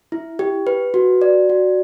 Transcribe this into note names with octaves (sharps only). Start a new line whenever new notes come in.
E4
G4
B4
F#4
D5
F#4